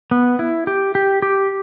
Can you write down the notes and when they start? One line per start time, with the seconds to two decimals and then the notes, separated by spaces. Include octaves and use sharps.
0.11 B3
0.39 E4
0.67 G4
0.95 G4
1.22 G4